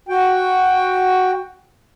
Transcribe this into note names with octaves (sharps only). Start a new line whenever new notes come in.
F#4 G5